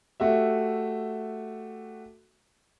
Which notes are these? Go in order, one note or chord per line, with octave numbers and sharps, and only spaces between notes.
A3 F#4 G4 E5